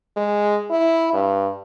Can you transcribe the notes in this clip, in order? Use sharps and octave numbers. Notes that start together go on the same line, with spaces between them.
G#3
E4
G2